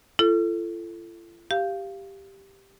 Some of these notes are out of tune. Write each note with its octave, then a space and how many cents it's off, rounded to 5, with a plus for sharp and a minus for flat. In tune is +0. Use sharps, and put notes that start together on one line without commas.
F4 -45 A4 +0
G4 +0 F5 -10